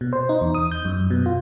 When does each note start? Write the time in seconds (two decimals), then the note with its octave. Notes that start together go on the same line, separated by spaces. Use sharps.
0.01 B2
0.13 C5
0.29 D#4
0.41 E2
0.54 D#6
0.71 G6
0.85 F#2
1.11 B2
1.26 F4